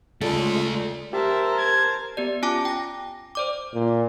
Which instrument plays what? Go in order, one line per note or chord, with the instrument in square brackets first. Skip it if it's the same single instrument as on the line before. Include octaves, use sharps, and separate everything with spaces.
[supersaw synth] C#3 G#3 [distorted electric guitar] A3 D5 [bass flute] F4 [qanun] A4
[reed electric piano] G4 [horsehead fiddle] A#4 [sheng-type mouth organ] C5 A5 [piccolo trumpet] E5
[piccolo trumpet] G#6
[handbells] B3 G4 D5
C#4 F4 G#5 A5 D6
G5 A#6
C5 D5 D6
[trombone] A#2